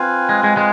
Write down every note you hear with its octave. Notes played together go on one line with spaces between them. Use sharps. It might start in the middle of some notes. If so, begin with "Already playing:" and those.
Already playing: C4 F4 B4 F5 G#5
G#3
G#3
G#3